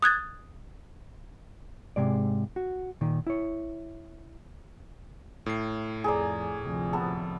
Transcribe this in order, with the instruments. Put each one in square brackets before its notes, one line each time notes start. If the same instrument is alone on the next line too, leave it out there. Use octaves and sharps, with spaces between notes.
[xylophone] D#6 F#6 G#6 A6
[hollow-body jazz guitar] G#2 C3 G#3 D5
F#4
A#2 D#3
E4 C#5
[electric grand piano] A2 C7
[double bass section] F2 [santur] G#4 A#4 D5
[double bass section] D2 C3 F3
[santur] B3 A4